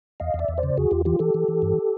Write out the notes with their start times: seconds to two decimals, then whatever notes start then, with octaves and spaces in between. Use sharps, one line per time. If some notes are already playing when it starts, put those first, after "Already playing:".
0.20 E2 D#5 F5
0.34 E2
0.39 D5 E5
0.48 E2
0.58 C5 D5
0.63 C#3
0.77 E2 F#4 G#4
0.91 E2 F4 G4
1.05 E3 F4 G4
1.19 E3 G4 A4
1.34 E3
1.48 E3
1.62 G2